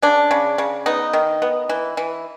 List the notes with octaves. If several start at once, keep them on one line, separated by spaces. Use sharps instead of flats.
C#3 D4
C#3
C#3
B3 D#4
D#3
B3
E3
E3